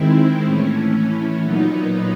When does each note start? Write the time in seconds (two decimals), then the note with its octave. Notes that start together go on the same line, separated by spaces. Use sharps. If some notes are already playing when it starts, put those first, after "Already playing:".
Already playing: D#3 G#3 C4 E4
0.44 A2 E3 A3 C#4
1.42 A#2 F#3 B3 D#4